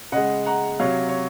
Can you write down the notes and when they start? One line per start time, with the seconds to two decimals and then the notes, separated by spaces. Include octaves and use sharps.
0.12 C#3 G#3 D#5 F#5
0.46 F#5 A#5
0.80 C3 F#3 C#5 F5
1.09 C#5